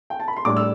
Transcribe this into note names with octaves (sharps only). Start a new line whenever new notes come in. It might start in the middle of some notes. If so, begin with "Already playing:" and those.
G5
A5
B5
C6
A2 G3 D4 D6
E6